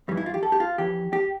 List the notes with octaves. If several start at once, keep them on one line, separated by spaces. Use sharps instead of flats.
G2 E3 G3
E4
F4
G4
A4
G4
F4
F2 E3 G4
G4